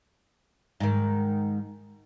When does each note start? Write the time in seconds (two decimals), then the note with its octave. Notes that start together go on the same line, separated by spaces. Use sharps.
0.80 G#2 D#3